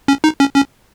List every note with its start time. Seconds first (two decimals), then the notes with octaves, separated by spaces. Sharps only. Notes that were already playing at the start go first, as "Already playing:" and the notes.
0.08 C#4
0.24 D#4
0.40 C#4
0.56 C#4